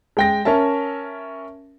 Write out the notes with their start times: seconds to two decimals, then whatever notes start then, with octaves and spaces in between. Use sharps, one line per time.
0.17 G#3 G5 A#6
0.45 C#4 A#4 E5 A5